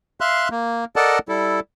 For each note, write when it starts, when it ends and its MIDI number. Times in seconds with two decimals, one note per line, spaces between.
0.21 0.49 76
0.21 0.49 77
0.21 0.49 84
0.21 0.49 90
0.51 0.85 58
0.96 1.19 69
0.96 1.19 70
0.96 1.19 74
0.96 1.19 75
0.96 1.19 78
0.96 1.19 81
1.29 1.60 55
1.29 1.60 64
1.29 1.60 69